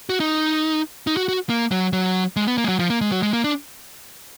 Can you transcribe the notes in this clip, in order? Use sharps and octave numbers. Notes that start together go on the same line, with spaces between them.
F#4
D#4
D#4
F#4
F#4
A#3
F#3
F#3
G#3
B3
A#3
G#3
F#3
F3
A#3
G#3
F#3
G#3
A#3
D4